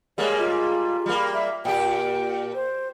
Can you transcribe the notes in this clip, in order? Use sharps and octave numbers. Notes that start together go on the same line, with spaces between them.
G3 G#3 A#3 C#5
F4
G3 A#3
E5
A#2 G4 G5
C5